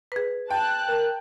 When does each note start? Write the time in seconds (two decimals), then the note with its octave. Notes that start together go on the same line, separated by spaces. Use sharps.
0.12 G#4 B4
0.50 G5 A5 F#6
0.88 A#4